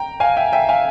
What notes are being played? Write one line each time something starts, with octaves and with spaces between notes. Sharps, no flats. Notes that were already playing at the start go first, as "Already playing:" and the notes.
Already playing: G5 A#5
F5 G#5
E5 G5
E5 G5
F5 G#5